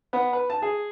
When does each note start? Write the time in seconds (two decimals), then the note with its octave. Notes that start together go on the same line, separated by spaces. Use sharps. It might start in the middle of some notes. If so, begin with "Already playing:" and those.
0.13 B3
0.33 B4
0.50 A5
0.62 G#4